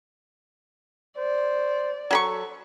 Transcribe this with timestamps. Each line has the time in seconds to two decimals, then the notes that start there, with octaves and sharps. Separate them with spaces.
1.18 C5 D5
2.11 F#3 A4 B5 C#6